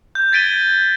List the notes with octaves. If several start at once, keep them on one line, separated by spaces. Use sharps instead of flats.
G6
G#6 A6 B6 D7 D#7 G7